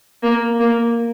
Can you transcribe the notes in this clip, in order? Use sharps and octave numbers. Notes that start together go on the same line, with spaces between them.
A#3
A#3